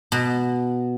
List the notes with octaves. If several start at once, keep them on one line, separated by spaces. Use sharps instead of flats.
B2